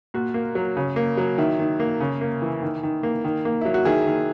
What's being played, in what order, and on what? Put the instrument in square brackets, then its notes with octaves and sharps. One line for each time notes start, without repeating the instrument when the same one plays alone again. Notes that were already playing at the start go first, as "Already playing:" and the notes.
[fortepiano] A#2 F#4
A#3
F#3
C#3
A#3
F#3
D#3 E4
D#3
A#3
C#3
A#3
E3
D#3
D#3
A#3
D#3
A#3
F#3 E4
F#4
D#3 E4 G#4
D#3